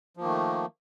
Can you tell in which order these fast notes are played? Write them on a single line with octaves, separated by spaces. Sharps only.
F3 A#3 D#3 A3